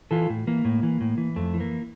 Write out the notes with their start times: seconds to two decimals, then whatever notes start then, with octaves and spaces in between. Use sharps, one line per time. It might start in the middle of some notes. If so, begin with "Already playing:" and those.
0.11 E3 F4 A4
0.30 A2
0.47 E3 A#3
0.65 A2
0.83 E3
1.01 A2
1.18 E3
1.36 F2 A3
1.54 E3
1.60 A#3